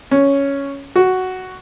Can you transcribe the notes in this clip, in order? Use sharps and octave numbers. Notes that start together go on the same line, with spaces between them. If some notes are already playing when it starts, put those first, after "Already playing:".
C#4
F#4